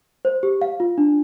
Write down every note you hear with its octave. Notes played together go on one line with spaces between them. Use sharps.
C5
G4
F5
F4
D4